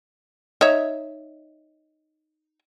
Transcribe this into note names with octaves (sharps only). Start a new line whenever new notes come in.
D#4 C#5 E5